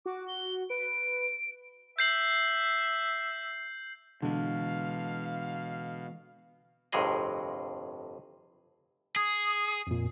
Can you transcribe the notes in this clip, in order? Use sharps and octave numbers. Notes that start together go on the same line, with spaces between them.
F#4 D6
G7
B4 D7
E5 G6 C7 F#7
B2 D3 E3 G#3 F5
G1 F2 A2 C3 G#4 D#5
G#4 D#6
F2 A#2